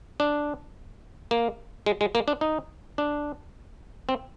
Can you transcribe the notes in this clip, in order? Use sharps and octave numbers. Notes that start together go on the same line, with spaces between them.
D4
A#3
G#3
G#3
A#3
D4
D#4
D4
C4